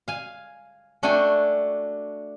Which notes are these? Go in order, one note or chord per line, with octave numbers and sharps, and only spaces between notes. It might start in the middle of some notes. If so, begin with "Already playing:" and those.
F5 G#5
A3 D4 F#4 G5 G#5